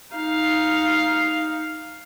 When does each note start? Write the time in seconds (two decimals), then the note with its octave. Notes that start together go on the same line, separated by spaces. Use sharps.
0.15 D#4 F5